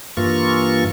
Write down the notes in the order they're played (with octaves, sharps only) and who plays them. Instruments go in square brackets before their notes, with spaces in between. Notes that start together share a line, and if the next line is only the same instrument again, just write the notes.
[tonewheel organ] G2 E3 A#3 F4 C#6